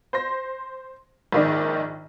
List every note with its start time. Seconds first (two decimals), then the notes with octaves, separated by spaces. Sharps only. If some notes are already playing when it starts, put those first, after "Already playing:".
0.13 C5 C6 A#6
1.32 A#1 G#2 D#3 D#4 D5